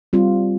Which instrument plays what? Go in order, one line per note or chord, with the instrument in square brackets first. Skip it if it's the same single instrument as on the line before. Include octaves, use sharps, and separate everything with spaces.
[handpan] G3 C4 F4